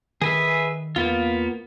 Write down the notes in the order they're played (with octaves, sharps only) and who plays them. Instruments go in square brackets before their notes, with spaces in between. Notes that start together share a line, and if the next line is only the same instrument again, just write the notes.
[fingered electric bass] D#3 [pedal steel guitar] G#4 B4 E5
[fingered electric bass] E2 [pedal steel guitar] A#3 B3 F4